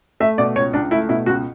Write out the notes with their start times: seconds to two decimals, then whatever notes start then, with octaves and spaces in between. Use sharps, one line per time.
0.20 A3 E5
0.38 B2 D5
0.55 C#2 C#5
0.73 C#2 D4
0.91 A3 E4
1.09 B2 E4
1.26 C#2 F#4